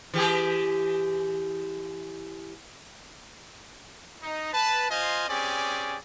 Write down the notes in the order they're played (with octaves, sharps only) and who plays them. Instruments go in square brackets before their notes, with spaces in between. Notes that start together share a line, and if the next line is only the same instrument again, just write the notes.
[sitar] E3 G4 G#4
[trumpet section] D#4
B4 A5
F4 C5 D#5 F5 G#5
C4 C#4 G4 G#4 D5